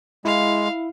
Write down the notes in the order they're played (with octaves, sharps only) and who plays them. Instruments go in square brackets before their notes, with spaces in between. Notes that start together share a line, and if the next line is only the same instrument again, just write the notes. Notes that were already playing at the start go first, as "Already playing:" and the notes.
[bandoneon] G#3 [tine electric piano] E4 [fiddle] F5